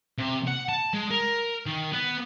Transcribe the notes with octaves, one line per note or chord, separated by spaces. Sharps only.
C3
F#5
A5
G#3
A#4
D#3
B3